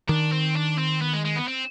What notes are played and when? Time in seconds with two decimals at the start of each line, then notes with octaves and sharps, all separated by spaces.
0.09 D#3 D4
0.32 C4
0.56 D4
0.78 C4
1.02 B3
1.14 G#3
1.25 G#3
1.36 B3
1.48 C4